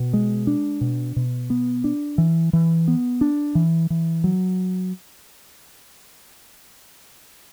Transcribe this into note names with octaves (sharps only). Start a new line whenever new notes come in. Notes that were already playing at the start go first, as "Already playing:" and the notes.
Already playing: B2
G#3
D4
B2
B2
B3
D4
E3
E3
B3
D4
E3
E3
F#3